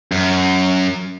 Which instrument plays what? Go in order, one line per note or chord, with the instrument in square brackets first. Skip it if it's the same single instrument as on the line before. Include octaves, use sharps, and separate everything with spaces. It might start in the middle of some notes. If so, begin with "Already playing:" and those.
[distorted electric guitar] F#2